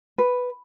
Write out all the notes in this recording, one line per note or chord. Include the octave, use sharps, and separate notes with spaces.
B4